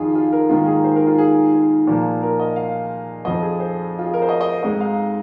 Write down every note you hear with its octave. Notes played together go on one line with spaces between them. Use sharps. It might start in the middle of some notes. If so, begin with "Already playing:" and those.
Already playing: F2 D#3 F4 G#4
F4
A#4
G#2 D#3 A#3 F4
G#4
C5
A#4
F4
G#4
G#4
A#2 F3 A#3
A#4
D#5
F5
F2 F3 C4 D#5
G#4
C5
F4
G#4
A#4
C5
D#5
D#5
C5
G#2 G#3 C4 D#4 D#5
F5